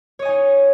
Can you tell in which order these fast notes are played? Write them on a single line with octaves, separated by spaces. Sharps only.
C#5 D#5 G#5 D#4